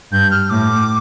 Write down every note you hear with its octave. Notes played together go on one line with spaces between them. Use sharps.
G2 G6
F6
A2 D6